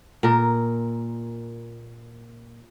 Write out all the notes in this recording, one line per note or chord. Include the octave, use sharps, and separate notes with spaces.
A#2 A#4